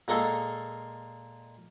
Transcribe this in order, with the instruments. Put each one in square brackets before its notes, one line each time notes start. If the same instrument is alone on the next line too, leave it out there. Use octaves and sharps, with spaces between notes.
[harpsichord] A#2 G#3 A#3 A4 D#5